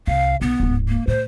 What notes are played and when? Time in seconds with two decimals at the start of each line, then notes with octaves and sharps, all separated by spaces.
0.07 C2 F5
0.41 B1 B3
0.60 D1 G#2
0.88 A#3
1.07 A2 C5